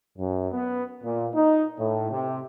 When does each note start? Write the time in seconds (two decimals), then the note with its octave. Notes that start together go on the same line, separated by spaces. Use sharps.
0.18 F#2
0.52 B3
1.02 A#2
1.34 D#4
1.78 A2
2.11 C3